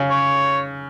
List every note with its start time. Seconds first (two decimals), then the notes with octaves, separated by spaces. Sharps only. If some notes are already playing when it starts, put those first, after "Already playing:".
Already playing: C#3
0.11 C#5